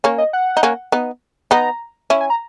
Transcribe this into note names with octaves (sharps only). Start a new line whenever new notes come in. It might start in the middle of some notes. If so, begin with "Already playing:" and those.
A#3 C#4 C#5
D#5
F#5
D#4
A#3 C#4
B3 D#4
B3 D#4 A#5
C#4 E4
G#5
A#5